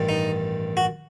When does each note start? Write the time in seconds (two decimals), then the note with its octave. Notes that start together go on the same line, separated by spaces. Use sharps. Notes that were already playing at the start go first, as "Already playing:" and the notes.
Already playing: A1 G2 D#3
0.09 D#4
0.77 F#4